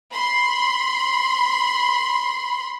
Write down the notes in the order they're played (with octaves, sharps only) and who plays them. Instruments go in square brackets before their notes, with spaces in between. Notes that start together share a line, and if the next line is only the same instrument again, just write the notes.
[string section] B5 C6